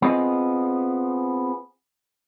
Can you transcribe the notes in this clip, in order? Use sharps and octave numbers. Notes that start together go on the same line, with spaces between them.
B3 C4 F4 G#4 D#5